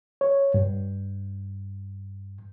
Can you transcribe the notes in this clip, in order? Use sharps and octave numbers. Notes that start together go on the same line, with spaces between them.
C#5
G2